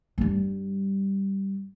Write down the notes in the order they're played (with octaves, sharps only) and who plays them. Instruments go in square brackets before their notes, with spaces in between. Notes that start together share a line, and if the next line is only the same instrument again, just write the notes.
[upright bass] G2 G3